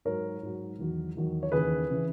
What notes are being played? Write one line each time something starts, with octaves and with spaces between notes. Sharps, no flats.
G#2 F#3 A#4 C#5
G#2 F#3
E2 D#3 F#3
E2 D#3 F#3
C#5
D#2 C#3 E3 G#4 B4
C#3 E3